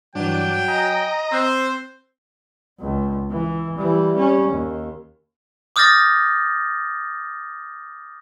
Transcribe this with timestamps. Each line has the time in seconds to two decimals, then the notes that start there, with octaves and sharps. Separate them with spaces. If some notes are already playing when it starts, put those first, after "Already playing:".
0.15 G2 E3 F#3 D4 G5
0.68 D#5 G#5 A#5
1.32 C4 C5 E6 F#6
2.80 C#2
3.30 E3
3.77 E3 G3
4.16 G3 C#4
4.49 D#2
5.76 D6 D#6 F6 G6 A6 A#6